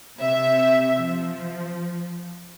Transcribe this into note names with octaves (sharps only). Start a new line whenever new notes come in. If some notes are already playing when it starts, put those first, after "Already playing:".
C3 E5
F3